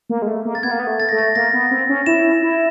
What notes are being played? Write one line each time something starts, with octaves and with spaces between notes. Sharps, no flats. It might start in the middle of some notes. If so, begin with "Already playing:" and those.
A#3
G#3
A3
A#3
A6
B3 G#6
A#3
B3
A3
A6
A3 A#6
A6
A#3 A#6
B3
C4
C#4
E4 E7
E4